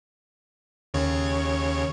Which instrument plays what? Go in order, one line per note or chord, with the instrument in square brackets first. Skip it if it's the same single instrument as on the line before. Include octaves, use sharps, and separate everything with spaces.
[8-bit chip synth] D#2 C#3 C#5